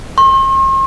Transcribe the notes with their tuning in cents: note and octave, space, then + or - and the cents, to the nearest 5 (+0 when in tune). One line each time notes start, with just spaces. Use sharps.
C6 +45